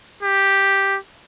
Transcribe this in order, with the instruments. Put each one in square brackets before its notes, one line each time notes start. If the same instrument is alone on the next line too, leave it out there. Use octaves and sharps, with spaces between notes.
[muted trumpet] G4